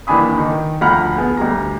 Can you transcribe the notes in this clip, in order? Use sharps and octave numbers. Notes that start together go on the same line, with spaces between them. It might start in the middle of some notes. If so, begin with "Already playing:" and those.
D#2 E3 D4 G#5 B5 D#6
D#3 D#4
D2 F3 F#5 A#5 B5 F6
B3 G#4
D2 G3 A#5